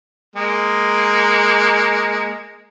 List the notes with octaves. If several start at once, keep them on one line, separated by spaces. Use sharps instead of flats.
G#3 A#3